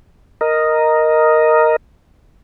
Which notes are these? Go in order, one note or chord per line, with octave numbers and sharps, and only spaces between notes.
A#4 D#5